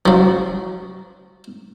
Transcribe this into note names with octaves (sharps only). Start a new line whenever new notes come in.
F3 F#3